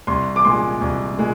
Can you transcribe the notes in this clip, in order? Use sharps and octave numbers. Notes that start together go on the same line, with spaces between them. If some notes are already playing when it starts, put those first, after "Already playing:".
C2 C6
D6
A#2 G#3 C6
C2
A#2 G#3